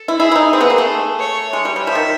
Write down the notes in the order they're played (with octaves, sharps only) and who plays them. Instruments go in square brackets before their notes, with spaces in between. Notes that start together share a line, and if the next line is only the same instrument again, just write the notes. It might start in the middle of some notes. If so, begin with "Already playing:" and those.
Already playing: [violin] A4
[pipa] E4
[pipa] E4 [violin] G#4
[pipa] E4
D#4
[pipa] C4 [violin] G#4
[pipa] B3
A#3
A3
[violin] C#5
[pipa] G#3 [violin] C#5
[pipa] G3
G3
[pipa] F3 [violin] E5
[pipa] D#3